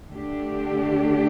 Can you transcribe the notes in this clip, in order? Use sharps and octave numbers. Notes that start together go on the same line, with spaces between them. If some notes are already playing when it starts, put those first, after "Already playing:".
D3 A3 D4 G4